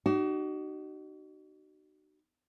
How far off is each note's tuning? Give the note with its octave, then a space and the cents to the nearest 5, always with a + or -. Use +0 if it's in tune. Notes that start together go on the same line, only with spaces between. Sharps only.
D#4 -35 F#4 +35